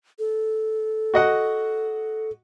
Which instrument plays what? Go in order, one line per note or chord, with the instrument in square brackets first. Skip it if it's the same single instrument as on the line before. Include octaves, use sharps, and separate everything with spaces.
[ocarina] A4
[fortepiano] F#4 D#5 F#5